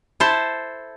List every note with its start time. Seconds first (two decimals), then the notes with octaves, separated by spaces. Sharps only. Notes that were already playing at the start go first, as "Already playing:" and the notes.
0.20 E4 A4 C5 A5